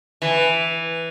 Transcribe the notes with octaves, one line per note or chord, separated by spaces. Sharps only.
E3